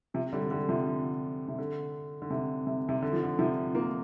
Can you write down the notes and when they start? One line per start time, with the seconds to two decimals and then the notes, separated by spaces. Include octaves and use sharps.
0.14 C3 F3
0.33 D3 G3
0.50 D3 G3
0.68 C3 F3
0.86 D3
1.48 C3
1.59 D3
2.22 D3
2.30 C3
2.67 C3
2.89 C3
3.02 D3
3.13 F3
3.23 D3
3.39 C3 F3
3.75 F3 A#3